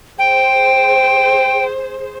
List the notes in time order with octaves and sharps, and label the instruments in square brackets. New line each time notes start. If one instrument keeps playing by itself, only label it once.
[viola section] G#4 C5 [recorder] G5